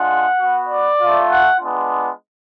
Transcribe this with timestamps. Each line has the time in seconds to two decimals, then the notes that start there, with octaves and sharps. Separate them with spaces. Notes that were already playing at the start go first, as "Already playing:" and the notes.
Already playing: G#3 D4 F4 F#5
0.39 B3 F#4
0.69 D5
1.00 A3 F4
1.30 F#5
1.60 G#3 B3 D4 F4